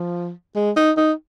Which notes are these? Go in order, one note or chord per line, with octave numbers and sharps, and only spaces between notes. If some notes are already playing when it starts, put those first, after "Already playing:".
Already playing: F3
G#3
D#4
D#4